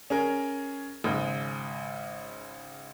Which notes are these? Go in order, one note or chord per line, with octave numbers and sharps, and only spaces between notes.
C#4 G#4 A#4
G#1 C#3